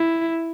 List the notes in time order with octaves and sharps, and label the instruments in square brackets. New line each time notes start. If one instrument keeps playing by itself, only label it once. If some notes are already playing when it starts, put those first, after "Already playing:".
Already playing: [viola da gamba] E4